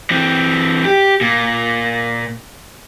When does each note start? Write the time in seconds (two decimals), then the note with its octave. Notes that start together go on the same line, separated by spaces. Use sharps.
0.11 E3 C4
0.85 G4
1.21 A#2